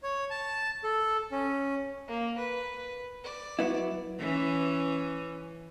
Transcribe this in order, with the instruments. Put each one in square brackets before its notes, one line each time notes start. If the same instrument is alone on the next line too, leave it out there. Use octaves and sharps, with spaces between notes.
[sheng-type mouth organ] C#5
A5
A4
C#4
[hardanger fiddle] A#3
B4
D5
[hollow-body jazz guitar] F#3 B3 E4
[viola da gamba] E3 C#4